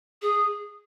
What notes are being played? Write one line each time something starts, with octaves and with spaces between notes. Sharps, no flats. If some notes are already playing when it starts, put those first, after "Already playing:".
G#4